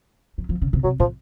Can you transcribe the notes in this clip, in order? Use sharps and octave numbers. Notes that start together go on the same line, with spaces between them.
F#3
F3
C#3
C3
C3 F#3
A2 F3